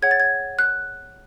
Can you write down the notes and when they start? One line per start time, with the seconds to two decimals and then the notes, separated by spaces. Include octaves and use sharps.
0.02 G#4 C#5 F#5 G#6
0.11 A6
0.20 G#6
0.59 F#6